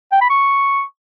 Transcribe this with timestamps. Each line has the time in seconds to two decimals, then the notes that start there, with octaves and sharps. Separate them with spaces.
0.12 G5
0.21 B5
0.30 C#6